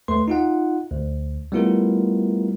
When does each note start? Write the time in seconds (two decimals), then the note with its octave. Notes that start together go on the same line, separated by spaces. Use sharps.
0.08 D#2 A3 B4 C6
0.28 D#4 F4 F#5
0.91 D2
1.52 G3 A3 B3 E4 F4 A#4